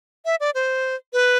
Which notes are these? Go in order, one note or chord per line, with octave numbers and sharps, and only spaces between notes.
E5
D5
C5
B4